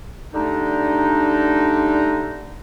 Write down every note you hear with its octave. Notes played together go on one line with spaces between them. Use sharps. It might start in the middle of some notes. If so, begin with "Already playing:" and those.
D3 G3 A3 D4 D#4